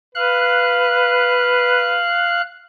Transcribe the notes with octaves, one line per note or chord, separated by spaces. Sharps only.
B4 F5 F#6